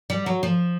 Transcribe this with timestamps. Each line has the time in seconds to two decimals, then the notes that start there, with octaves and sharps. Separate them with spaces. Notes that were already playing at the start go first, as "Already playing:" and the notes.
0.10 G3
0.26 F#3
0.43 F3